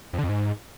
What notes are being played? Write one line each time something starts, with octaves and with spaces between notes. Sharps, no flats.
F2
D3
F2
G#2